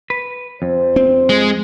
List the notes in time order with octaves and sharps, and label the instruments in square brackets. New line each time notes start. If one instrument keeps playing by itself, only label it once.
[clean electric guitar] B4
[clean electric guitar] F2 [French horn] C5
[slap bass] C4
[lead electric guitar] G#3